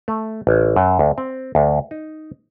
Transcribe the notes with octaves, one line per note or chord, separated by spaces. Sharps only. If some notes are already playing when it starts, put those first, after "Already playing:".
A3
A1
F#2
D2
C4
D2
D#4